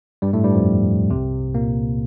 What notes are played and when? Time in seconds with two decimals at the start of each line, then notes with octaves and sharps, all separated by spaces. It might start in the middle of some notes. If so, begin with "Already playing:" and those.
0.22 G2 G3
0.33 A2 A3
0.44 G2 G3
0.55 F2 F3
1.10 C2 C3
1.55 A#2 A#3